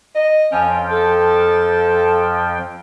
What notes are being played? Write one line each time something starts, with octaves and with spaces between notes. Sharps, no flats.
D#5
F2 F3 C#4 G5
A4